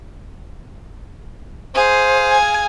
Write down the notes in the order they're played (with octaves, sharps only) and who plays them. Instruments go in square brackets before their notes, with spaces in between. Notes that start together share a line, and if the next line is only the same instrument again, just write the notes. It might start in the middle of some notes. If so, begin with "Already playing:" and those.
[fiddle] G#4 F5 [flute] C5
[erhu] G#5